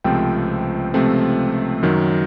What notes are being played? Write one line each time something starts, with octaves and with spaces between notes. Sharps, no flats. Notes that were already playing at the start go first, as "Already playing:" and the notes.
C#2 C3 F3 A3 C4 G5
C#2 C3 F3 A3 C4
F#2 D#3 F#3